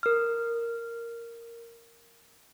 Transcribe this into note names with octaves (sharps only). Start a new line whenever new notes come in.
A#4 F6